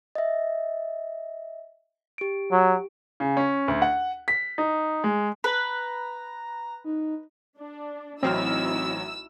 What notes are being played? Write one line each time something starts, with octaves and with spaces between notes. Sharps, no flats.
D#5 E5
G4 D7
F#3
C#3
C#4
D2
F#5
B6
D#4
G#3
B4 A#5
D#4
D4
A1 F#3 C4 D#4 E4 F#4 E6 F6